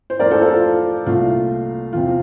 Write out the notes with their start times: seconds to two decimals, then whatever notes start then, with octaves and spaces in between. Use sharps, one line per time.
0.10 C5
0.20 F2 E3 A3 A#4 D5
0.31 A4 C5
0.42 F4 A4
0.53 F4
1.06 C2 A#2 A3 F4
1.93 E2 C3 F3 C4 F4